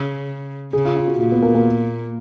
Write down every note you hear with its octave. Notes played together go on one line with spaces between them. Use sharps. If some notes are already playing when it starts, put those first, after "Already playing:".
Already playing: C#3
C#3 G#4
F4
F4
F#4
A#2 F4
B3
A#3
A#3